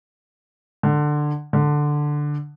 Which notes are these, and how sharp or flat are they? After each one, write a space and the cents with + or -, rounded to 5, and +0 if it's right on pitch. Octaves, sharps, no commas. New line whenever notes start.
D3 +15
D3 +5